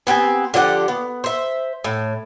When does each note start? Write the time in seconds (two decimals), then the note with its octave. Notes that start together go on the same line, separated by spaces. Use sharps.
0.07 B3 C4 G4 G#5
0.54 D3 F3 G4 F#5
0.88 B3
1.24 C5 E5
1.84 A2